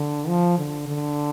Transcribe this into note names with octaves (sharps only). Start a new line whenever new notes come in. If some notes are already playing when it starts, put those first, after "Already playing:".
Already playing: D3
F3
D3
D3